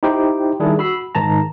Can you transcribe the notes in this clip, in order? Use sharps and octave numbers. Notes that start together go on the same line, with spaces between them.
D#4 E4 G4 C5 G5
D#3 G3 D4 E4 G#4
F#4 B5 E6 C7
G#2 D#3 A5 A#5